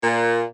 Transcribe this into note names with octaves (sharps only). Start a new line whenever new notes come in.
A#2